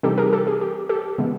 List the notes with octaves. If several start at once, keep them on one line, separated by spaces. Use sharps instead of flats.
C3 E3 G3 C4 D#4 G4 A4
G#4 A#4
G4 A4
G#4
G4
G4 A4
C#3 E3 G#3 B3